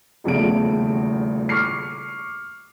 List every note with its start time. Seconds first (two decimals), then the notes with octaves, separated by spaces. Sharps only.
0.24 D#1 A#1 E2 C#3 A3 D7
1.49 C#6 D6 F6 C7